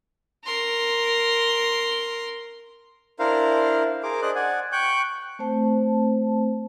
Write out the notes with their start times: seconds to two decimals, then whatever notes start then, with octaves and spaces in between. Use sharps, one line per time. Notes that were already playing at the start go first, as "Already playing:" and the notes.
0.45 A#4 C6
3.19 D4 E4 A#4 C5 F5
4.03 G#4 A#4 C5 D6
4.22 D4 G#4 C5 D5 D#5 F#6
4.36 D5 F#5 G#5
4.72 G5 C#6 F#6 G6
5.39 A3 C4 C5 A5